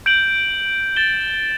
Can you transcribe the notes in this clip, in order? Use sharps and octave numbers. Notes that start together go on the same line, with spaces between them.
G6 D7 F#7
A6 E7 G7